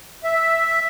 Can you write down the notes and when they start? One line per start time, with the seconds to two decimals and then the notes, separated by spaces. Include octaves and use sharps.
0.24 E5